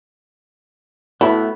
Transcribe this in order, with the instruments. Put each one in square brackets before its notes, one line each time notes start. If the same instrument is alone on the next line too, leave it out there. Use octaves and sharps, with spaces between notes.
[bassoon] A2 [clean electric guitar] A3 B3 [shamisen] E4 [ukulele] F#4 B4 B5